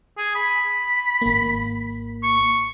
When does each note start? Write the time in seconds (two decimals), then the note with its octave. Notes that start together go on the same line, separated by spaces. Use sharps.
0.18 G#4
0.35 B5
1.22 G#1 A#3
2.23 C#6